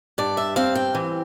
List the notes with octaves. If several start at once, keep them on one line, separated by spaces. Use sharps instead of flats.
G2 D5
E5
C4 F5
G5
E3